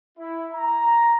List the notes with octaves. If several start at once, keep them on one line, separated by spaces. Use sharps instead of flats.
E4
A#5